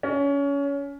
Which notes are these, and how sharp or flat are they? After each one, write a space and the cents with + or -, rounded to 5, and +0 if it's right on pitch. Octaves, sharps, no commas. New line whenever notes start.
C#4 +25